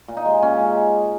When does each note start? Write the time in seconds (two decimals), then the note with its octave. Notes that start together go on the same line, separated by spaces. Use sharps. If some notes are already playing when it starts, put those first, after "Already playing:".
0.08 A#2
0.17 D#4
0.25 G#3
0.42 A#2 C#4
0.59 G#3